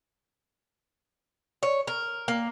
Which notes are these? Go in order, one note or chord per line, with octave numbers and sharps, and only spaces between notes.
C#5
A#4
A#3